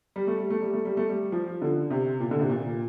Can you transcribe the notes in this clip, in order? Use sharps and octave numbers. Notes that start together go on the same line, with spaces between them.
G3
A3
G3
A3
G3
A3
G3
A3
G3
F3
D3
C3
A#2
D3
C3
A#2